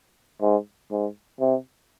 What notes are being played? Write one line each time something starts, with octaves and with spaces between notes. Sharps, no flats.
G#2
G#2
C3